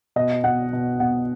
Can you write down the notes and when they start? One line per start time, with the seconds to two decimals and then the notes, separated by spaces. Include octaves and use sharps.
0.16 B2 D#5
0.44 B2 F#5
0.73 B2
1.00 B2 F#5